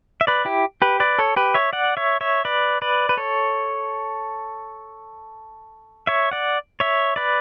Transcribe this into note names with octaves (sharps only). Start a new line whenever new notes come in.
E5
B4 D5
E4 G4
G4 B4
B4 D5
A4 C#5
G4 B4
C#5 E5
D5 F#5
C#5 E5
C#5 E5
B4 D5
B4 D5
B4
A4 C#5
C#5 E5
D5 F#5
C#5 E5
B4 D5